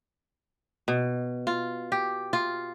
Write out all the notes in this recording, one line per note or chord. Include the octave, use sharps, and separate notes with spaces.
B2
F4
G4
F4